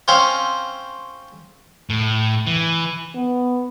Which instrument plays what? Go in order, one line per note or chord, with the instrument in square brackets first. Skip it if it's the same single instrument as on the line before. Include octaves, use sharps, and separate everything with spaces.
[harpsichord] C4 C#4 F5 G5
[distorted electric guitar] A2
E3
[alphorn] B3